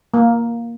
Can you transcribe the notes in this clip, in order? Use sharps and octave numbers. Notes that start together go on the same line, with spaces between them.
A#3